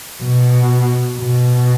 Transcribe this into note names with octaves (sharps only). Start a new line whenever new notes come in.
B2
B2